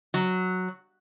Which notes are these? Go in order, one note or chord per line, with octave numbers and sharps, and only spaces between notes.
F#3